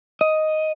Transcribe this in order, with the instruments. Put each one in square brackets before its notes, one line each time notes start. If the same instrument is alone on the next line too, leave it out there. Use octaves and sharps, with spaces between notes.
[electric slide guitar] D#5